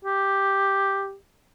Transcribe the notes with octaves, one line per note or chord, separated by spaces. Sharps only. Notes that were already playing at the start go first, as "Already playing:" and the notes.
G4